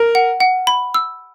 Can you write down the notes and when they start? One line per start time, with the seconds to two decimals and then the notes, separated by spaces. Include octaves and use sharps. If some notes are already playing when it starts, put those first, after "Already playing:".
Already playing: A#4
0.15 F#5
0.40 F#5
0.67 B5
0.94 E6